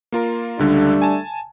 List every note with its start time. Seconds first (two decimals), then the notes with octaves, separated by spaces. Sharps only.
0.12 A#3 F4 A#4
0.59 C#2 D3 G3 A3 D4
1.02 G#5 A5